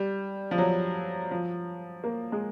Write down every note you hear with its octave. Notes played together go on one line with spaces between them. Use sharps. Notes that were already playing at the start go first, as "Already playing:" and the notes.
Already playing: G3
F3
F#3
F3
A#3
G#3